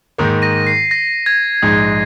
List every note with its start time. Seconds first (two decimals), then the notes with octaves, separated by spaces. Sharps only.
0.18 G#2 D#3 A#3 D#4
0.42 A#6 D#7
0.67 C7
0.91 A#6
1.26 G#6
1.62 A#1 G#2 G#3 D#4